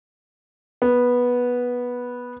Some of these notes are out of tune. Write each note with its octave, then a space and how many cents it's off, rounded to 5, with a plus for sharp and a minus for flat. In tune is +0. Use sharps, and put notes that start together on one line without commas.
B3 -10